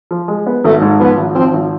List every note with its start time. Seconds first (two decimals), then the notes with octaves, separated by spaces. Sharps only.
0.11 F3
0.28 G#3
0.46 B3
0.64 G#1 A3
0.81 G#2
1.00 F3 B3
1.17 G#1
1.35 F3 C4
1.53 G#1